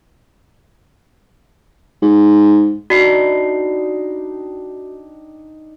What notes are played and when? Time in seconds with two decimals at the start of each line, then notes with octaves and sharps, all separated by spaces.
2.02 G#2
2.90 D4 D#4 F#4 G5 C7